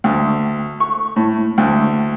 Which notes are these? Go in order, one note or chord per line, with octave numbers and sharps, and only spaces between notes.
D2
C#6
A2
D2